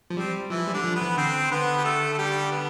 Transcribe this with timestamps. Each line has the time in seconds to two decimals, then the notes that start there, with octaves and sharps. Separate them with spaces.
0.10 F3
0.17 G3 C4
0.50 E3 F3 E4
0.68 G3
0.73 D3 D4
0.84 F3
0.95 B3 B4
1.02 E3
1.17 D3 C4 C5
1.44 C5
1.51 D3 B3 B4
1.77 G4
1.84 A3 A4
2.13 A4
2.18 G3 G4
2.51 B3